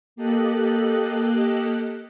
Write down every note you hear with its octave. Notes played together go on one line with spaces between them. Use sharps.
A#3 G4 A4 D#5 F#6